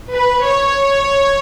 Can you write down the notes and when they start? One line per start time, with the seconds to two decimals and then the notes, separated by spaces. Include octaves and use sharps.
0.12 B4
0.42 C#5